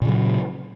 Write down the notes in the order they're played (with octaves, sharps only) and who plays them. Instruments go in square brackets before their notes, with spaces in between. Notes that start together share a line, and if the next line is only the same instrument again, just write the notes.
[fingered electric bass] A#2
C#3
F#3